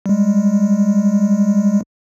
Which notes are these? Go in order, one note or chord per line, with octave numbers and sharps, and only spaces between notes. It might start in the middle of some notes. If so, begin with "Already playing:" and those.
G3 G#3